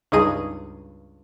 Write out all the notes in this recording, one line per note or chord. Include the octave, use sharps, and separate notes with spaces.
C#2 G2 D#4 G#4 D#7